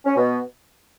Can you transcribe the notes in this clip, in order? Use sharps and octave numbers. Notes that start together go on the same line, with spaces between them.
C#4
B2 B3